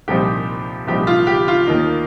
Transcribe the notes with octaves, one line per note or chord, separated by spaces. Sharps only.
C2 A#2 F3 C4 D#4 G4
C2 A#2 F3 C4 D#4 G4
F4
G4
F4
D#2 D#3 A#3 D#4